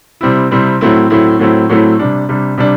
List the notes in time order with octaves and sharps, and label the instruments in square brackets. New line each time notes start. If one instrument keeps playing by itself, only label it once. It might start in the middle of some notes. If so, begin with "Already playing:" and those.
[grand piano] C3 G3 C4 E4
C3 G3 C4 E4
A2 F#3 A3 C4 E4
A2 F#3 A3 C4 E4
A2 F#3 A3 C4 E4
A2 F#3 A3 C4 E4
C3 G3 D4
C3 G3 D4
C3 G3 D4